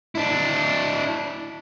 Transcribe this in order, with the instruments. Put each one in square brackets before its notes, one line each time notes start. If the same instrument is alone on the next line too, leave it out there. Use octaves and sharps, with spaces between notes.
[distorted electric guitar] D4 E4